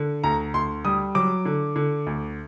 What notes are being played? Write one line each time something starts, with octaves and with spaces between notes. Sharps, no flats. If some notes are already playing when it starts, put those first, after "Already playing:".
Already playing: D3
D2 A#5
D2 C6
G3 D#6
F#3 D6
D3
D3
D2